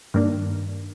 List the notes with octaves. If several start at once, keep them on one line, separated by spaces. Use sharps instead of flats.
G2 D#3 A#3 D4